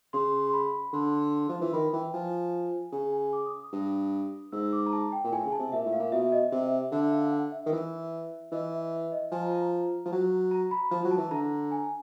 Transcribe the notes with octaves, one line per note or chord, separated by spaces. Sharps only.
C#3 C6
C6
B5
D3 C6
F3
E3
D#3 B5
E3 G5
F3 G#5
C#3 G#5
G#5
D6
D#6
D#6
G2
G#2 E6
D6
A#5
A5
G5
A#2
A2 G#5
C#3
A5
C3
A#2 E5
A2
F5
A#2
B2 E5
D#5
C3 E5
D3 E5
F5
F#5
E5
D#3
E3
E3 D#5
E5
E5
D#5
F3 G#5
A#5
A#5
A#5
F3
F#3
A#5
B5
F3
F#3
A5
E3
D3 A#5
G#5